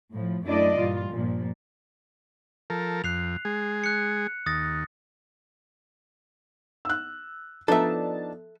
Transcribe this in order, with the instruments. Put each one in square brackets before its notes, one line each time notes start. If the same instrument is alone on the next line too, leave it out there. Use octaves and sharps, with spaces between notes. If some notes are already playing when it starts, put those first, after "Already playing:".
[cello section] A2 F3
F#2 A3 D4 E4 D5 D#5
G2 A#2 E3 F4
G2 A#2 F3
[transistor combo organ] F3 A4 A#4
[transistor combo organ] F2 [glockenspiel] F#6 C7 F7
[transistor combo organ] G#3 G#4
[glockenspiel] F#6 C#7
[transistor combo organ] D#2 [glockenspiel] D#6 A6 A#6
[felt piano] E6 F#6
[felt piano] F3 B3 [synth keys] D4 D#4 A5 [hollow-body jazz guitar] A4 E5